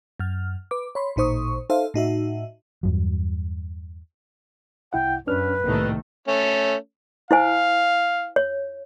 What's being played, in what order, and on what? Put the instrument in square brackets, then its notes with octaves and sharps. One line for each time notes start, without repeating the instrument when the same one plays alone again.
[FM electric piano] F#2 F6
B4 D6
C#5 B5 C6
A1 A#2 D#4 C5 C#6 D#6
D#4 A4 C5 E5 F5
A2 D#4 F#4 E5
[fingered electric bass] E2 G2 F#3
[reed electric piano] C2 E4 F#5 [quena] G5
[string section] F#2 [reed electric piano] C#4 D4 F6 [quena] B4
[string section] C2 D#3 A3 [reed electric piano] A2 A#3
[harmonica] A3 C#4
[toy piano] E4 C5 G#5 [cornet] F5
[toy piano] C#5